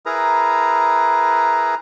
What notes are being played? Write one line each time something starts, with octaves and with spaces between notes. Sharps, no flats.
E4 G#4 A#4 B4 A#5